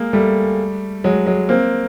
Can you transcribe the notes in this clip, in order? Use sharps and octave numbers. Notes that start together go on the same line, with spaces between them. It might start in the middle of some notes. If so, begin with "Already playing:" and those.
Already playing: G#3 A#3
G3 A3
F#3 G#3
F#3 G#3
A#3 C4